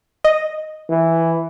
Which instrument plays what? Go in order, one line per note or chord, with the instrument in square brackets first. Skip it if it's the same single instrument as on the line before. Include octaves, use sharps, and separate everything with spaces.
[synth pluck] D#5
[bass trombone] E3